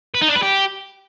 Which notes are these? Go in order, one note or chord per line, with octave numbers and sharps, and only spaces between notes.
B4
D#4
D4
B4
G4